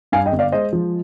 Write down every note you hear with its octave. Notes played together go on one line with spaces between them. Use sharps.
G2 F5 G#5
D#5 G5
G1
D5 F5
G#3 C5 D#5
F3